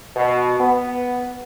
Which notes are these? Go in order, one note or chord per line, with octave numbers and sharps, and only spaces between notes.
B2
B3